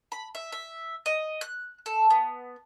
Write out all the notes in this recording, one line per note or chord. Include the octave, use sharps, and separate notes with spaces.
B5
E5
E5
D#5
F#6
A4
B3